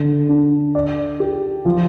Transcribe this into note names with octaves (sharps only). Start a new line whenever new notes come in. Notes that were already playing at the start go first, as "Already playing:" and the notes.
Already playing: D3
D4
D5
G4
F3